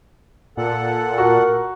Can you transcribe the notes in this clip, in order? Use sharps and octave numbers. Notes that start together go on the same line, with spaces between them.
A#2 A4 F#5
F#4 A#4